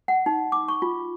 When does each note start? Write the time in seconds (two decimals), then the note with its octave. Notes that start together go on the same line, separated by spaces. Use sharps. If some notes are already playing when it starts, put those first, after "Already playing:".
0.08 F#5
0.26 D#4
0.52 D6
0.68 C#6
0.82 F4